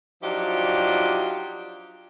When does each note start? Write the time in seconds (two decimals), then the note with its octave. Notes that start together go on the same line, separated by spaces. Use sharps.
0.23 F3 F#3 D4 D#4 F4 G4